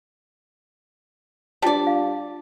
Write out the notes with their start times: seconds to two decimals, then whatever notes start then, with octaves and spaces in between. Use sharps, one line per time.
1.62 G3 D4 F4 D5 A5
1.87 F5